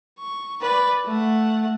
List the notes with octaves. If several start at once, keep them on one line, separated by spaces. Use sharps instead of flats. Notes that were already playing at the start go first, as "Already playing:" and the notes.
C#6
B4 D5
A3 F#5